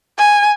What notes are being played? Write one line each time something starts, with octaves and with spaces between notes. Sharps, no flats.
G#5